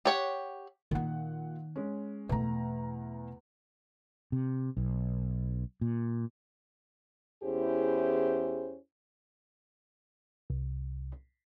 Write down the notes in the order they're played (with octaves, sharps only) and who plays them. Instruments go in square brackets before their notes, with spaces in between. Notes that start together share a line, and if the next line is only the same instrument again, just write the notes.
[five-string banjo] G4 C#5 F#5
[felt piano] A#2 F#5 [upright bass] D#3 A#3
[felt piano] G#3 C#4
[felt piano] E2 A#5 [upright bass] B2 A3
[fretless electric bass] C3
B1
A#2
[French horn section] E2 C#4 E4 G4 G#4 C5
[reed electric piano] C2